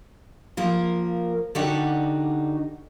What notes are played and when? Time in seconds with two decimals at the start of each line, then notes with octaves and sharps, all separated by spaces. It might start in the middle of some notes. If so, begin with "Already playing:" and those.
0.57 F3 A#3 A#4
1.55 D3 D4 D#4 F#4 G4 F#5